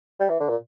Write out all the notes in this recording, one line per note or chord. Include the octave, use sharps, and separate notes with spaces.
G3
E3
D3
A#2